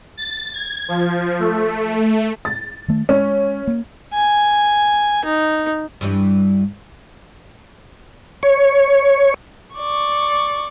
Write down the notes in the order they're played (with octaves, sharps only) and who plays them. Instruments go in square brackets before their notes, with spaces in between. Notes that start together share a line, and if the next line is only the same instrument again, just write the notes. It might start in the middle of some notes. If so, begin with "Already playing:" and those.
[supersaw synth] A6
G#6
F3
A3
[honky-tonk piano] A6
[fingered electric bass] D#3 A3
[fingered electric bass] G#3 [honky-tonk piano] C#4
[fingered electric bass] A#3
[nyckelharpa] G#5
D#4
[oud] G2 E3 G3
[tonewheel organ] C#5
[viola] D5 C#6